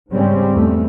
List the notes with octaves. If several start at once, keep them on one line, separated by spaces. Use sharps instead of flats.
G#2 C#3 G3 G#3 C4 C#4
E2 A3